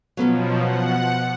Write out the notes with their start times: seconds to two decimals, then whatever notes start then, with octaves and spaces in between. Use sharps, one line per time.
0.17 B2 F3 F#3 B3 C#4
0.60 F#5